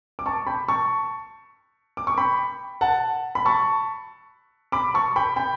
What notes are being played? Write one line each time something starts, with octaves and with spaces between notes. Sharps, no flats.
D6
A5 C#6
G5 B5
A5 C#6
D6
C#6
G5 B5
F#5 A5
B5
A5 C#6
B5 D6
A5 C#6
G5 B5
G5 B5